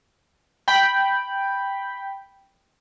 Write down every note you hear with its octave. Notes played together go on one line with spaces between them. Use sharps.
G5 B5